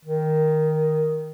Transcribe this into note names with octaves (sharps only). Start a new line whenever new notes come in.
D#3